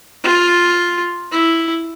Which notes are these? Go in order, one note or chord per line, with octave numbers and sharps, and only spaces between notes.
F4
E4